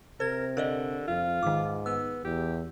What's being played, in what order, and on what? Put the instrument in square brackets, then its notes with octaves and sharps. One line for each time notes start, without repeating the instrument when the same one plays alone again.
[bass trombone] C3 [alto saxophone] A#4 [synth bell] C5 G#6
[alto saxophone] D3 [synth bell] A#4 D5 D#5
[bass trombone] F2 [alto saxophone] F4
[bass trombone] G#2 [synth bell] D#3 D6
[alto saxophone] B3 [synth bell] E6
[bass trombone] E2 [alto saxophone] G4